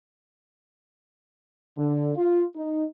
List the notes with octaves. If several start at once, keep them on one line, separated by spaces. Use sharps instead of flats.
D3
F4
D#4